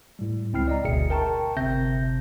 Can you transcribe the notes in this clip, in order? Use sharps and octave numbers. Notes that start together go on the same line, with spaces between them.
A2 G3
C#2 C4 E4 G5 F6 C7
D5 D#5 A#5
G1 D2 B2 G#4 E5 C#7
A#4 G5 A5 A#5 C#6
G1 C3 C4 E5 G6 A#6